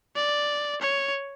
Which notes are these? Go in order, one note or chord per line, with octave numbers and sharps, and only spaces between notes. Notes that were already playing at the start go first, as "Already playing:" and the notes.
D5
C#5